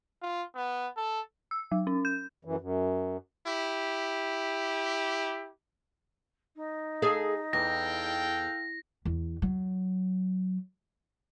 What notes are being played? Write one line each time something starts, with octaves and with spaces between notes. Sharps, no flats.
F4
B3
A4
E6
F#3
C#4
G6
F#2 E3
F#2
E4 G4
D#4
G#4 A4 F5
E2 A4 F5 G5 A#6
E2
F#3